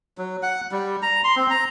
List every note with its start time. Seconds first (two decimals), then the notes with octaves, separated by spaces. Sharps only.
0.18 F#3
0.43 F#5
0.72 G3
1.02 A#5
1.24 C6
1.36 C4
1.50 A#5